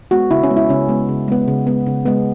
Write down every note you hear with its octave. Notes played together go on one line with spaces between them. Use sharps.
G#3 B3 F#4
C#3 E4
C#4
G#3 B3
E4
C#3 C#4
G#3 B3
C#3
G#3 B3
C#3
G#3 B3
C#3
G#3 B3